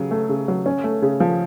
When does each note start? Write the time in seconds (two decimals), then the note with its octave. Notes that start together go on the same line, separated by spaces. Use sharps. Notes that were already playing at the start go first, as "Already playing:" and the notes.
Already playing: C#3 F#3
0.11 A3
0.29 C#3
0.48 F#3
0.66 C#4
0.84 A3
1.02 C#3
1.20 F3